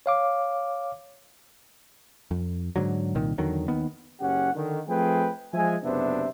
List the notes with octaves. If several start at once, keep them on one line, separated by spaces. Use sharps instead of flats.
C#5 F5 D6
F2
G#2 D3 F#3
C2 A#2 D#3
E2 D3 D#3 F#3
D#2 D#3 B3
F#1 C#4 G4 F#5
D3 D#3
F3 A3 C4 G#4 B4 G5
F3 G#3 E5 G#5
F#1 C3 B3 D4 C5 E5